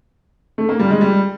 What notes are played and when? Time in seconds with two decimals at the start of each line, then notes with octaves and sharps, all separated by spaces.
0.58 A3
0.69 A#3
0.79 G3
0.90 G#3
1.01 G3